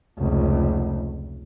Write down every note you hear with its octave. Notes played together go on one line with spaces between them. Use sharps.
F1 C#2